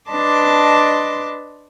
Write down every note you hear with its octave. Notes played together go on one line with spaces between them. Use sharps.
D4 B4 D#5 A5 C6 D6